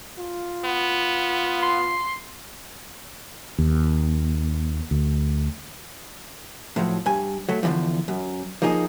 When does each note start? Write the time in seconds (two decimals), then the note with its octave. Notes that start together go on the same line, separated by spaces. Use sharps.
0.18 F4
0.65 B3
1.63 C6
3.58 D#2
4.91 D2
6.76 A2 F3 F#3
7.06 G2 G#5
7.49 F#3 A3
7.63 E2 A2 D3 E3 F3
8.08 F#2
8.62 F3 A#3 D#4 G#4